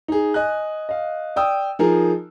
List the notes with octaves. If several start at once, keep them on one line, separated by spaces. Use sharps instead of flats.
D#4 G#4
D#5 G#5 F#6
D#5 F5
D5 G5 D#6 E6
F3 D#4 G#4 A#4